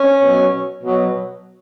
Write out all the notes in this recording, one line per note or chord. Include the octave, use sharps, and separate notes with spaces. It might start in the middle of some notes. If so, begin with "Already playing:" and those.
Already playing: C#4
B2 F#3
B2 F#3